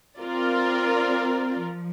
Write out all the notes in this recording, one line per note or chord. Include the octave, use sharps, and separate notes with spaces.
C4 F4 A#4 D5
F3